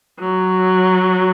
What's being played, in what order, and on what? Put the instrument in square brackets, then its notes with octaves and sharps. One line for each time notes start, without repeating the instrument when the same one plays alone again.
[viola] F#3